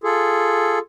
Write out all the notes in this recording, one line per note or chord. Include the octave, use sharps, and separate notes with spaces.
F4 G#4 A4